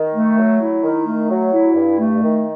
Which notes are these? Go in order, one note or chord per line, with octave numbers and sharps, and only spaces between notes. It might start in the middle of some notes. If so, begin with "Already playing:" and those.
Already playing: D#3
A3
F#3
E4
D#3
A3
F#3
E4
G2
A3
D#3